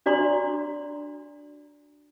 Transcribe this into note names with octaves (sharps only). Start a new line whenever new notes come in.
D4 F#4 D5 A#5 C6